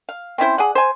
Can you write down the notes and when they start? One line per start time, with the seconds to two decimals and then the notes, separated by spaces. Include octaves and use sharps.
0.09 F5
0.38 C4 C#4 E4 C5
0.58 G#4 D5 F#5
0.75 C5 G#5